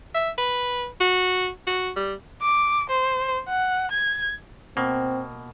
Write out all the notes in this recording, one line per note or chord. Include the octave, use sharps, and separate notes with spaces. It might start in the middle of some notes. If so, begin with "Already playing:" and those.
E5
B4
F#4
F#4
G3
D6
C5
F#5
G#6
B2 A#3 C4